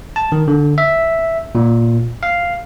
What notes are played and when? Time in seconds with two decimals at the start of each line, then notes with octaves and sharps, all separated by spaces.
0.16 A5
0.32 D#3
0.48 D3
0.78 E5
1.55 A#2
2.23 F5